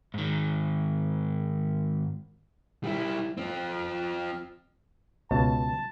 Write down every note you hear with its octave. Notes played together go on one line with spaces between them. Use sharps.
G#2 D#3
G3 E4
F3 C4
C#2 B2 A5